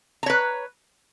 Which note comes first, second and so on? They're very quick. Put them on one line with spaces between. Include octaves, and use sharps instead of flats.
A#5 C#5 B4